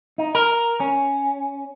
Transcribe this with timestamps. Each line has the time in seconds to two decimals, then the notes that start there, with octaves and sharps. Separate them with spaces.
0.18 D#4
0.35 A#4
0.80 C#4